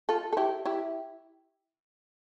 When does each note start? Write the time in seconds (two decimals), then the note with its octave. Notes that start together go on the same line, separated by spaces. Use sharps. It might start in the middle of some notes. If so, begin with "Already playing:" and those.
0.09 F4 A4
0.33 A4
0.37 E4 G4
0.65 E4 G4